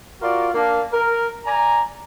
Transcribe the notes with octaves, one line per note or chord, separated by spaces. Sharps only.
F4 F#4 A#4 D5
A#3 D4
A#4
D5 G#5 A#5